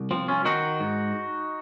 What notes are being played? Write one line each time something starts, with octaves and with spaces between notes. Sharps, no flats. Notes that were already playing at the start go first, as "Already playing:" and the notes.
Already playing: C2
F3 C4
C#4 F4
D#3 D#4 F#4
G#2